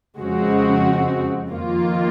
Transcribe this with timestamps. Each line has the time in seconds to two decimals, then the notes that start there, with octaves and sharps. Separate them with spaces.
0.18 F2 C#3 G#3 C4 F#4
1.50 F2 D#3 A#3 F4